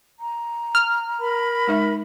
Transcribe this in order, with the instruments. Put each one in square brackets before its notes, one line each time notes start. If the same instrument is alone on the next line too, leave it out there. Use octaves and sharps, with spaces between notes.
[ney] A#5
[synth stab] F6
[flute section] A#4 B5
[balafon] G#3 D#4 E5